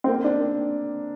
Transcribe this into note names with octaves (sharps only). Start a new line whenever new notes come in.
C4
A#3
D4